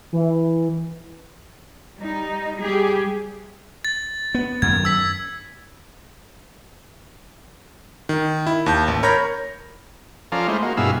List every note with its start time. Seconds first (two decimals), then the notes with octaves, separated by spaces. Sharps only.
0.13 E3
1.97 G3 D#4
2.60 G3 G4 G#4
3.85 A6
4.35 B3
4.62 F#2 D#3 G#6
4.85 E6 B6
8.09 D#3
8.47 E4
8.66 D#2 A5 G6
8.88 A1
9.03 A#4 C#5 A#5 B5 G6 A#6
10.32 F3 C#4 A4 D5 F5 A#5
10.48 G#3 A3 D#4 E4 C5
10.62 A#3 F#4
10.77 G2 B2 E4 G#4 F5 E6